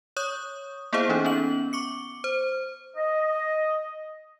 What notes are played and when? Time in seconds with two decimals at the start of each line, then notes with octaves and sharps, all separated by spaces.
0.16 C#5 C#6 D#6 G6
0.93 A#3 B3 E4 G#4 C5 F5
1.09 E3 C#4 D#4
1.25 B3 C#4 F#7
1.73 C#6 D6 C#7
2.24 C5
2.97 D#5